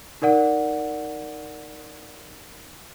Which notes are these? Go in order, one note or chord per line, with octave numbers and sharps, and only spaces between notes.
D#4 A#4 D5 F#5